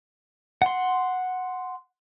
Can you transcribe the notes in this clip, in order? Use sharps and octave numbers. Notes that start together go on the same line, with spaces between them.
F#5 C6